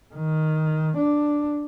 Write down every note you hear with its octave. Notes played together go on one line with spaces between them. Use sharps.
D#3
D4